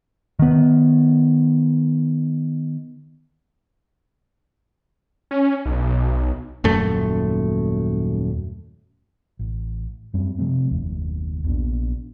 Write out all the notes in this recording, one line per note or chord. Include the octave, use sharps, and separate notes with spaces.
D#3 B3
C#4
B1
D#1 F#2 A3
A1
F#2 G3 C4
C3 F3 A3 C4
F#1 D#2
A#1 B3 D4